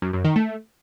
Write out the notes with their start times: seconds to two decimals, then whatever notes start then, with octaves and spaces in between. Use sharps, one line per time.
0.02 F#2
0.13 F#2
0.25 D#3
0.36 A3